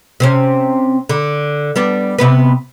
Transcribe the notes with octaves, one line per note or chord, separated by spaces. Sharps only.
C3 C4 C#4
D3
G3 B3 D4
C3 B3 B4